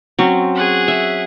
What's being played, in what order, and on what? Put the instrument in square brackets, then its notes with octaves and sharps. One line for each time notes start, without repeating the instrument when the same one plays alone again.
[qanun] F#3 C4 C#4
[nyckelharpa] G#4 F#5
[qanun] E5